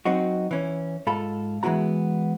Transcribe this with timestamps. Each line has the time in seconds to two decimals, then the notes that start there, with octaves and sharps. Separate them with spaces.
0.05 F#3 C4 D#4 F#4
0.51 E3 C#4
1.07 G#2 F4 A4 B5
1.63 E3 G#3 B3 E4 F#4 A#5